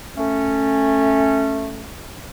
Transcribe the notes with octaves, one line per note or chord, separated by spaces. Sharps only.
A3 C#4